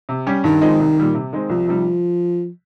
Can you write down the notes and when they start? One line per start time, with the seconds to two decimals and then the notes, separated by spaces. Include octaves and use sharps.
0.09 C3
0.26 G3 C#4 G4
0.44 G2 D#3
0.61 F3 G#3 C4 D#4
0.79 C2
0.97 A#2 G3 A#3
1.15 C3
1.33 D#3 G#3 C4
1.49 C2 F3
1.68 C3 D#3 G3